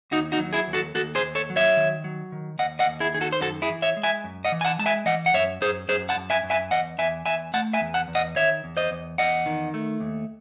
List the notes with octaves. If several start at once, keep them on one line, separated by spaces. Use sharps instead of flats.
D#2 D#4 F#4
D#4 F#4
F#3
E4 G#4
D#2
F#4 A4
D#2 F#4 A4
G#4 C5
D#2
A4 C#5
F#3
C#5 E5
D#3
F#3
D#3
D#2 D#5 F#5
D#5 F#5
D#2
E4 G#4
D#3 G#4
F#4 A4
C5
F#2 F#4 A4
E4 G#4
E3
C#5 E5
G#3
E5 G#5
F#2
D#5 F#5
E3
G#5
F#5 A5
G#3 A5
E5 G#5
E3 D#5 F#5
F#5
F#2 C#5 E5
F#2 G#4 C5
F#2 G#4 C5
F#5 A5
F#2
E5 G#5
F#2
E5 G#5
E2 D#5 F#5
E2 E5 G#5
E2 E5 G#5
A3 F#5 A5
E5 G#5
E2
F#5 A5
E2
D#5 F#5
D#3 C#5 E5
E2
C5 D#5
E2
E2 D#5 F#5
D#3
A3
D#2